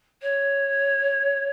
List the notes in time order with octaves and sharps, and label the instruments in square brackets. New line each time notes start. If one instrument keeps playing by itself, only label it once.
[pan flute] C#5